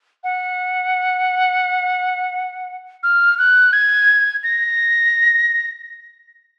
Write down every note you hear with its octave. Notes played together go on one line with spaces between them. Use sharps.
F#5
F6
F#6
G#6
A#6